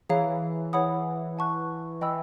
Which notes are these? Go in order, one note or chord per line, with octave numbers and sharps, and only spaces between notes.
E3 G#4 C#5 F5 A#5
E3 G#4 C#5 F#5 B5 D#6
F#5 A5 C#6 F#6
E3 D#5 G5 B5 E6